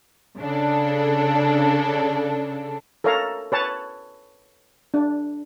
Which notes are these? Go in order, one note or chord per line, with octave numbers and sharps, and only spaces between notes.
C#3 D4 A4
A4 A#4 C#5 F5 A#5
B4 C#5 A5
D4